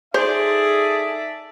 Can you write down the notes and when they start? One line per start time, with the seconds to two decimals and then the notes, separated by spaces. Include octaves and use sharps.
0.14 D#4 G#4 A4 C5 D5 E5 A5